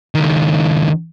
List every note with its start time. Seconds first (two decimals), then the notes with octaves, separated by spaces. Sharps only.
0.15 C#2 D#3